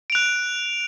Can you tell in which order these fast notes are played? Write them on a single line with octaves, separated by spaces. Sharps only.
D7 F7 F#6